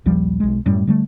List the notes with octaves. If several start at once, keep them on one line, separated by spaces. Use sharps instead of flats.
A#1 D#2 F3 G3
B1 G#3
F#2 A2 G3
D3 G3 A3